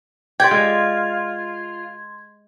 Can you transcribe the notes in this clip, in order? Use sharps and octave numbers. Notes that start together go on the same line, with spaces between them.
G4 D5 F#5 G5 C6 G#6
G#3 F4